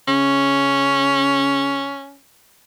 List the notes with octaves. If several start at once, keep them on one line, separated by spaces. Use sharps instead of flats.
C#3 C#4